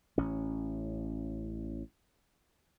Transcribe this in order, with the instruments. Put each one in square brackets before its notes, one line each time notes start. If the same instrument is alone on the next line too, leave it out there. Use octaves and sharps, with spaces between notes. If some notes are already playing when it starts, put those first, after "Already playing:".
[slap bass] A1 C#4